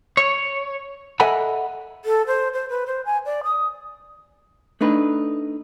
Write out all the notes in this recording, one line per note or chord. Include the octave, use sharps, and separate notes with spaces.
C#5
A4 D#5 E5 F#5 G#5 B5
A4
C5
C5
B4
C5
G#5
D5
D#6
A3 D4 D#4 B4